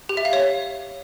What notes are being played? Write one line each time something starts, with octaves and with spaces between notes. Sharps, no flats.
G4
E5
F5
C#5